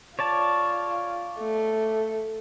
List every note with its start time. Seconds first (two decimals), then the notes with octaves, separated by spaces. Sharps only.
0.19 F4 C#5 D5 A5
1.39 A3